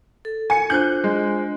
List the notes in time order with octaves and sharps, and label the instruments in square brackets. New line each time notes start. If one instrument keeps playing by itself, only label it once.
[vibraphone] A4
[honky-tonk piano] G#5 C#7
[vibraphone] D4 F4 C5 [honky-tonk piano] F#6 G6
[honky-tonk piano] G#3